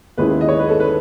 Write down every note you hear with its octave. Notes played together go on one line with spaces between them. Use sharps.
D#2 D#3 G#3 C#4 E4 B4
D#5
C#5
B4
A4
B4